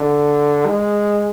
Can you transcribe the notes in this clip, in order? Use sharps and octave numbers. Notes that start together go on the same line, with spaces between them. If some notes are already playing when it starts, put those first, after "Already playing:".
Already playing: D3
G#3